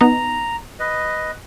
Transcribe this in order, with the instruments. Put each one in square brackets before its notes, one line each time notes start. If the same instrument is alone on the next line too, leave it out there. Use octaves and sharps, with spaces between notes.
[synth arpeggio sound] B3 D#4 [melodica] A#5
[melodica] B4 D#5